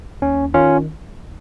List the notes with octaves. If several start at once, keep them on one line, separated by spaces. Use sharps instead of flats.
D#2 C#4
D#3 C#4 F4